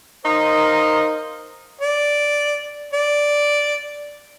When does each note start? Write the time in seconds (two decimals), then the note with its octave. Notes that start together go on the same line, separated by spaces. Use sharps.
0.25 D#4 A#4 C5 D#5 F5 C6
1.81 D5
2.93 D5